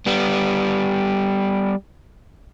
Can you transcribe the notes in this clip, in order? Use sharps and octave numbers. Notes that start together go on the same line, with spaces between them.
G3 B3